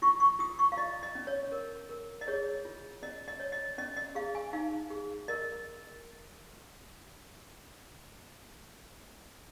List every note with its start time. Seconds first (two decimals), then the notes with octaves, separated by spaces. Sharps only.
0.02 F4 C#6
0.20 C#6
0.39 F4 D#6
0.59 C#6
0.72 F5
0.77 F4 D#5
1.03 D#5
1.15 C#4
1.27 C#5
1.52 A#4
1.89 A#4
2.21 D#5
2.28 G#4 C#5
2.65 F4
3.02 C#4 D#5
3.28 D#5
3.40 C#5
3.52 D#5
3.78 C#4 D#5
3.97 D#5
4.15 G#4 F5
4.35 G#5
4.53 D#4 F5
4.90 G#4
5.28 A#4 D#5